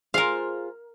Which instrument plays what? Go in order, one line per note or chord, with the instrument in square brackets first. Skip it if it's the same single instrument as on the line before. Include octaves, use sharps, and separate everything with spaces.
[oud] F4 G#4 C5 [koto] A#4 F5